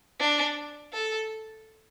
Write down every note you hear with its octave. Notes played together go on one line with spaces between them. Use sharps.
D4
A4